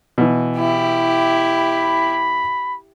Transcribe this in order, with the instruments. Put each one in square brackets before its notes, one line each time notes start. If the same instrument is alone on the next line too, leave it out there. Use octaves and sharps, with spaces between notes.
[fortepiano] B2 E3
[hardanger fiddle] E4 G4
[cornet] B5